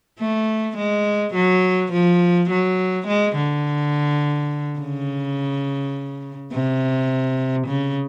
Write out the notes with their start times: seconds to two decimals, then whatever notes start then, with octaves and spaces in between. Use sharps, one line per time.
0.19 A3
0.77 G#3
1.34 F#3
1.92 F3
2.50 F#3
3.07 G#3
3.36 D3
4.80 C#3
6.52 C3
7.67 C#3